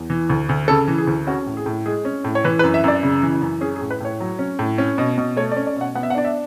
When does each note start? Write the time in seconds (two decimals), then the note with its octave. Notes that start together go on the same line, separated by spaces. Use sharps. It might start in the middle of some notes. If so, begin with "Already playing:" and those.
Already playing: E2
0.10 E3
0.30 D2
0.49 D2
0.68 C#3 A4
0.88 E3
0.98 G#4
1.07 D2
1.27 C#4 F#4
1.47 A2
1.57 G#4
1.66 A2
1.86 G#3 G#4
2.05 C#4
2.24 A2
2.35 C#5
2.44 E3 B4
2.59 B4
2.64 F#2
2.74 E5
2.84 F#2 D5
3.03 C#3
3.22 E3
3.42 F#2
3.61 C#4 G#4
3.76 G#4
3.81 A2
3.90 B4
4.00 A2 C#5
4.20 F#3
4.39 C#4
4.59 A2
4.78 C#4
4.98 B2
5.18 B2
5.37 A3 C#5
5.52 D5
5.57 C#4
5.67 D5
5.76 B2 F#5
5.95 B3 F#5
6.03 E5
6.10 F#5
6.15 D4 D5
6.25 E5